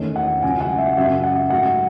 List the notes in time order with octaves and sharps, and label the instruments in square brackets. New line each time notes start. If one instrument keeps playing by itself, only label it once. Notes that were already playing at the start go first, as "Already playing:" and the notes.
Already playing: [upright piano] E2 D#3 A3 C#4
F#5
C#2 C#3 F#3 G#5
F#5
E5
F#2 C#3 F#3 E5
F#5
G#2 F#3 A3 F#5